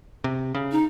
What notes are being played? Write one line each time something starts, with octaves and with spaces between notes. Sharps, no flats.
C3
C#3
D#4